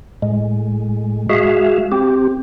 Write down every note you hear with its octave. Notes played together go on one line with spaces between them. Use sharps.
A2 G#3
G#3 F#4 G#4 E5 F5
C4 G4